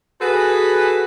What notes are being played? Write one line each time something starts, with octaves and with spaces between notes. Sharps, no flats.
F#4 G#4 A4 B4